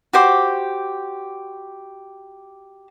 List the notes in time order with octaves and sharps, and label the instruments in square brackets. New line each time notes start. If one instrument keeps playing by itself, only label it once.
[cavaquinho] F#4 G4 C5 D6